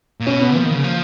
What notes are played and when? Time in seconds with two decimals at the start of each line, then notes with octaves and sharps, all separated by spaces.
0.20 A#2
0.27 B2 C#4
0.41 B3
0.55 F3 A#3
0.65 D#3
0.74 C#3
0.84 F3